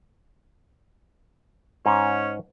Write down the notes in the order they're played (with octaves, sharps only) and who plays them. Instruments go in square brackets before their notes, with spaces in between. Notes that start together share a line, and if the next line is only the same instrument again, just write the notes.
[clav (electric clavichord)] G#2 [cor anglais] C#4